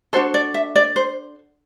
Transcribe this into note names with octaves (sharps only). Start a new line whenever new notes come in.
D4 F#4 A4 C5
D5
E5
D5
C5